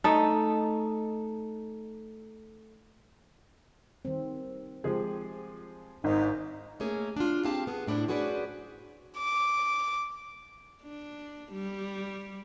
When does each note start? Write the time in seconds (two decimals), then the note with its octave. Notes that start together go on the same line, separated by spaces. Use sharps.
0.04 A3 D#4
4.05 D#3 G3 C4
4.84 F3 G#3 C4 G4 G#4
6.04 G#1 G#2 D#4
6.80 A3 A#3 C#4 G#4
7.16 D4 F4
7.44 C4 G4 G#4 F5 A5
7.67 B3 G#4
7.87 A2 D4 E4 C5
8.08 C#4 F#4 G#4 B4 C5 D5
9.18 D6
10.82 D4
11.52 G3